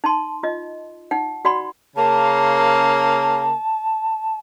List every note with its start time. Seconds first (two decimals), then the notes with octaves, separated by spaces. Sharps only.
0.04 D#4 A5 C6
0.43 F4 D#5
1.11 D#4 F#5
1.45 F#4 D5 F#5 B5 C6
1.96 C#3 A#3 A5